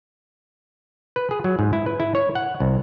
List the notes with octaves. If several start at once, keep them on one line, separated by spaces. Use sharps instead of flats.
B4
G#4
F#3
G#2
E4
B4
E4
C#5
F#5
C2